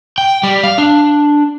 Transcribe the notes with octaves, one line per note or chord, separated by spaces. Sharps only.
G5
G3
F5
D4